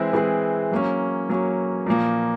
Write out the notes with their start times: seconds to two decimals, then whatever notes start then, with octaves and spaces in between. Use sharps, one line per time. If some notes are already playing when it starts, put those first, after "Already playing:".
Already playing: E3 G#3 C4 E4 G#4
0.13 E3 G#3 C4 E4 G#4
0.72 F#3 A#3 C#4
1.29 F#3 A#3 C#4
1.86 A#2 F3 A#3